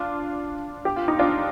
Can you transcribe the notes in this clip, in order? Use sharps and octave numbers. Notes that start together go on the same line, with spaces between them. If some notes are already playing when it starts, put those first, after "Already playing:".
Already playing: D4 F4
G4
F4
D#4
D4 F4